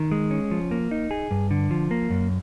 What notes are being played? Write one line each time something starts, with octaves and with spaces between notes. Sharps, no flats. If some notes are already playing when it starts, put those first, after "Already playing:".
Already playing: D#3
G#3
C#4
F3
A#3
D#4
G#4
G2
D3
F3
A#3
F#2